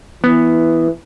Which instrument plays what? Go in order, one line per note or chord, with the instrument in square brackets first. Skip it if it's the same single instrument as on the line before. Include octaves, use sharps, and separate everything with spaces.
[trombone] E3 [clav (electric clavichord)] B3